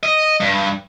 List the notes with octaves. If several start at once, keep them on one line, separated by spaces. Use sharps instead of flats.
D#5
G2